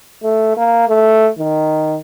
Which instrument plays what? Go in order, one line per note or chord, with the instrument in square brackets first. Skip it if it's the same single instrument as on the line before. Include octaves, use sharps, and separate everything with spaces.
[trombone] A3
A#3
A3
D#3